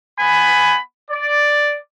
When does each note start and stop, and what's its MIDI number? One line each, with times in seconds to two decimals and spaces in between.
0.19 0.76 59
0.19 0.76 80
0.19 0.76 83
1.10 1.76 74